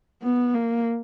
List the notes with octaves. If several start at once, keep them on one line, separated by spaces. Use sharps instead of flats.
B3
A#3